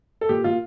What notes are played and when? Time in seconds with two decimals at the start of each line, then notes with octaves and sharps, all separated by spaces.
0.21 A4
0.29 A#2 G4
0.44 A#2 F4